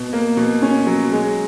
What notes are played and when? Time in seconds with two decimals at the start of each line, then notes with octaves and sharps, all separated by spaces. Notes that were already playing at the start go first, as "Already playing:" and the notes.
Already playing: B2
0.13 A#3
0.37 B2
0.62 C#4
0.87 F#3
1.12 G#3